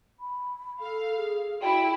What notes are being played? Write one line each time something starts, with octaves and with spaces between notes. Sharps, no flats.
B5
A4 F5
G#4
E4 F#4 G5